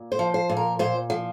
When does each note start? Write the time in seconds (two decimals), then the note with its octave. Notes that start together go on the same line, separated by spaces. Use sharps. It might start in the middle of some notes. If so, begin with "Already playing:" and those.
Already playing: A#2
0.12 C5
0.19 F3
0.34 C5
0.49 A#2
0.57 A#4
0.79 A#2 C5
1.10 F3